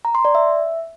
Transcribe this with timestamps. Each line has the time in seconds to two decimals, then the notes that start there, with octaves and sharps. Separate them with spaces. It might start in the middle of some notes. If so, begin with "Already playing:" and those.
0.05 A#5
0.15 C6
0.25 D5
0.35 E5